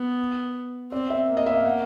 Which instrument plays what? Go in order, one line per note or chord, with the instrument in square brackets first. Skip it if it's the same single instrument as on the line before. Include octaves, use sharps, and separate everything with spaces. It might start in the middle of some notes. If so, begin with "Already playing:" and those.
Already playing: [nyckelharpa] B3
[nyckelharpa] C4 [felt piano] D5
[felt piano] E5
[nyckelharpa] A#3
[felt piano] D#5
E5
F5
F#5